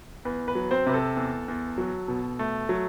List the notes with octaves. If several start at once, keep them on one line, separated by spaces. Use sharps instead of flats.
E2 B4
B4
F#3
C4 C5
C3 B4
A4
E2
E2
F#3
B2
A3
F#3